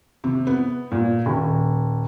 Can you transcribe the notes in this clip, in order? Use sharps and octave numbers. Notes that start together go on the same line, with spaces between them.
C3
B3
A#2
D#1